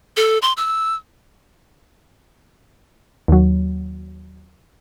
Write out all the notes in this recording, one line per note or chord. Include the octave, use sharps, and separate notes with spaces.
A4
C6
E6
D#2 F#3